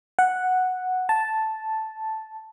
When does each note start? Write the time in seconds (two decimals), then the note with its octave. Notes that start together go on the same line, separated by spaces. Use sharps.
0.19 F#5
1.09 A5